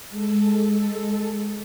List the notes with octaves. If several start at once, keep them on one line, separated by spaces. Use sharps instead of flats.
G#3 A4